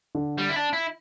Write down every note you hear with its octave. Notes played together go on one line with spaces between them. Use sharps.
D3
G3
E4
D4
E4